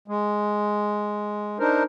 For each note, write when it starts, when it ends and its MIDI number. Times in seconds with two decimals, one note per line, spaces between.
0.08 1.58 56
1.60 1.83 62
1.60 1.83 63
1.60 1.83 70
1.60 1.83 72